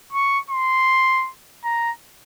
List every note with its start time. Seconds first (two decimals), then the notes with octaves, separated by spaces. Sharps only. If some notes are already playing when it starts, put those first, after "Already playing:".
0.12 C#6
0.50 C6
1.64 A#5